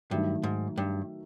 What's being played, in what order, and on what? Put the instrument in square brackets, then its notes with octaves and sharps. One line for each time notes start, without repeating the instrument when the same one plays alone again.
[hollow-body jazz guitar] G2 [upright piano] D#3 F#3 A3
[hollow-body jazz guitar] G#2
G2